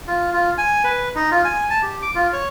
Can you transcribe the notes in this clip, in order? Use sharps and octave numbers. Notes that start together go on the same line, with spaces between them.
F4
F4
G#5
B4
D#4
F4
G#5
A5
G4
D6
F4
C#5